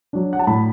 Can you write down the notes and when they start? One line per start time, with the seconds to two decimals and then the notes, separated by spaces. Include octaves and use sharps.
0.13 F#3 D4
0.33 F#5
0.39 A5
0.47 A2 B5